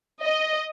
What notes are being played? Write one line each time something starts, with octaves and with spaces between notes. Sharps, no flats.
D#5